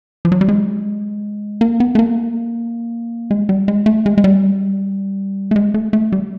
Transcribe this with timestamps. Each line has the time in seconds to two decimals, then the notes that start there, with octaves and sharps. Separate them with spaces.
0.25 F3
0.32 F#3
0.41 G3
0.49 G#3
1.61 A#3
1.80 B3
1.95 A3
1.99 A#3
3.31 G#3
3.49 G3
3.68 G#3
3.86 A3
4.06 G#3
4.18 G#3
4.24 G3
5.51 A3
5.56 G#3
5.74 A3
5.93 A3
6.12 G3